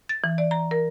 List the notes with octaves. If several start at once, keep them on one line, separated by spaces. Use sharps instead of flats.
A6
E3
D5
A#5
A#4